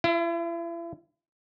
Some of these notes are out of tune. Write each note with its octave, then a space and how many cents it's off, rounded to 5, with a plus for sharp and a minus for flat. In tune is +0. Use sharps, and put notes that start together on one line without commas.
E4 +40 E5 +0